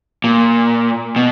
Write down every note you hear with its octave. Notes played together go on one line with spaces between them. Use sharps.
A#2
B2